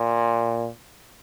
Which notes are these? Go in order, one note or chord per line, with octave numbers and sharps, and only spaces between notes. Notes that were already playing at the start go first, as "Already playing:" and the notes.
Already playing: A#2